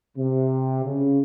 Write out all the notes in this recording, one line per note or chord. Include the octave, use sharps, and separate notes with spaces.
C3
C#3